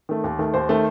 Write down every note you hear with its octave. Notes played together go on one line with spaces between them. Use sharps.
D#3 A3
D#2
D#3 A3
D#2 C5
D#3 A3